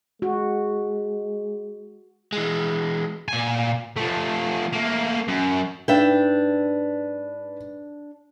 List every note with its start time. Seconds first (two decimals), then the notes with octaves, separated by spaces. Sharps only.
0.22 G#3 F#4
2.32 E3 G#3
3.28 A#2 G#5
3.96 F3 A3
4.73 A3 A#3
5.28 F#2
5.88 G#2 D4 B4 E5 G5